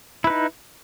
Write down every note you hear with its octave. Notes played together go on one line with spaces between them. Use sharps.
D#4 E4 B4